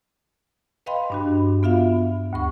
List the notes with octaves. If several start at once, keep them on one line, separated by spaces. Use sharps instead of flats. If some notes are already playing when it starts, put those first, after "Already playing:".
B4 D#5 F5 G5 B5 C6
G2 D4 F#4
B3 F4 E5 F5
D2 G2 C#6